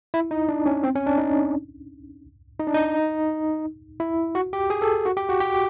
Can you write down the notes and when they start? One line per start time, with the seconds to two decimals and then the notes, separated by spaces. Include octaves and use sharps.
0.14 E4
0.31 D#4
0.49 D4
0.66 C#4
0.83 C4
0.95 C#4
1.06 D4
1.18 D#4
2.60 D#4
2.67 D4
2.74 D#4
4.00 E4
4.35 F#4
4.53 G4
4.70 G#4
4.82 A4
5.06 F#4
5.17 G4
5.29 F#4
5.40 G4